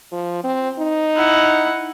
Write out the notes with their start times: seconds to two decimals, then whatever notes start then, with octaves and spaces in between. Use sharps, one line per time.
0.12 F3
0.44 C4
0.79 D#4
1.16 E4 F#5